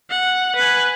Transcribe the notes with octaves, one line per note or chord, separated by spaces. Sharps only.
F#5
B4 G#5